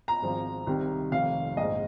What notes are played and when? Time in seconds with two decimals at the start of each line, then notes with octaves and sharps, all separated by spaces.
0.08 A#5
0.22 G#1 G#2 F3 C4
0.67 C2 C3 D#3
1.12 F1 F2 D#3 F5
1.57 A#1 G#2 F3 D#5